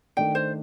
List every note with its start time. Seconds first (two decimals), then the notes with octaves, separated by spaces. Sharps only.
0.17 D#3 A3 D4 G5
0.35 C5